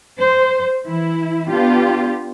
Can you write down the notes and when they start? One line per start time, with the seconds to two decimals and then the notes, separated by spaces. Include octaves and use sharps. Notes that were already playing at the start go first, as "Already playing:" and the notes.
0.19 C5
0.86 E3 E4
1.47 B3 D4 F4 G4